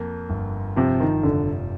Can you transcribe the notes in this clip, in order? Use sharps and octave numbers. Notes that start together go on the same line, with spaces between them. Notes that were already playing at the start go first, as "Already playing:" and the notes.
Already playing: F2 A#3
G1
C3 F3
D#3
F1 D3